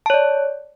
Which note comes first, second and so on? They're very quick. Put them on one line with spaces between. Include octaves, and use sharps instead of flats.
A5 C#5 D5